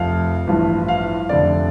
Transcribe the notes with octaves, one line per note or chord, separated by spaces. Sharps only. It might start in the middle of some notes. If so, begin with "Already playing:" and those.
Already playing: F1 F2 F3 F5
A1 G2 F3
F5
F1 F2 D3 D5